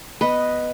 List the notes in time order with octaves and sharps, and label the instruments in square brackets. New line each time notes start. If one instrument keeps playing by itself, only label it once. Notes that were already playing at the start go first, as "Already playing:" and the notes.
[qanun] B3 B4 D#5